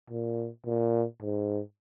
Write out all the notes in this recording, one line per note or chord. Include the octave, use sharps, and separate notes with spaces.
A#2
A#2
G#2